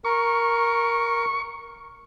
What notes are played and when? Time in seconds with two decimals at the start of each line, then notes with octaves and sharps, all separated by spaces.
0.05 A#4 C#6